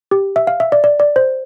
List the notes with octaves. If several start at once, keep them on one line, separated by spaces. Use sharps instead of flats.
G4
E5
F5
E5
D5
D5
D5
C5